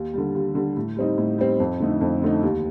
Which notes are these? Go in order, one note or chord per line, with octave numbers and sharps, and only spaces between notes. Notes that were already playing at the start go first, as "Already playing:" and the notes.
Already playing: D#2
D3 G3
D#2
D3 G3
A2
G3 C4 D#4
A2
G3 C4 D#4
F2
D3 A3 D#4
F2
D3 A3 D#4
D#2